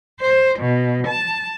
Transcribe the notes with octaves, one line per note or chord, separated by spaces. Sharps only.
C5
B2
A5